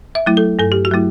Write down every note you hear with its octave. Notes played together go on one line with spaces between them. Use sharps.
E5
F#3 A3 E4
A4
G2 A4
G4
F#4
F#3 A3 E4